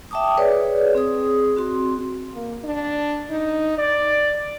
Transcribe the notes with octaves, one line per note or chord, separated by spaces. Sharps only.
E5 G5 A5 D6 D#6
G#4 B4 C#5 D5
C4 G#4 D#6
C4 F#4 C6
A#3
D4
D#4
D5